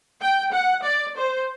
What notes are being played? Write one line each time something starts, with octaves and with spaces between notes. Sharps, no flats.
G5
F#5
D5
C5